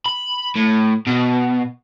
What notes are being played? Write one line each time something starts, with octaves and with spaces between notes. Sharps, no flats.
B5
A2
B2